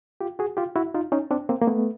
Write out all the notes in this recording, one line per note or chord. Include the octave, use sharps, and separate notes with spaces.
F4 G4
F#4 G#4
F4 G4
E4 F#4
D#4 F4
C#4 D#4
C4 D4
A#3 C4
A#3
A3 B3